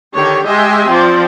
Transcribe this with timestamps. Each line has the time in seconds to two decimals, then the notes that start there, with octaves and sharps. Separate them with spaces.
0.15 D3 D#3 G4 C#5
0.47 G#3 G4 D#5 E5 G#5 C6
0.88 F3 C4 C5 D5